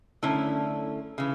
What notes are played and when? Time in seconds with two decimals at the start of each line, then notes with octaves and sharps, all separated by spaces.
0.23 F#2 D3 A3 C#4 E4
1.18 C#3 E3